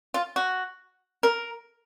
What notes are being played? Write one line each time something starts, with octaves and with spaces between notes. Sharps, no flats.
F4
F#4
A#4